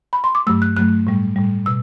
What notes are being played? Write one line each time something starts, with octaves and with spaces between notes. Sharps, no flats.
B5
C6
D6
G2 F#3 A3 E6
F#6
G2 F#3 A3 F#6
A2 G3
A2 G3
B2 E6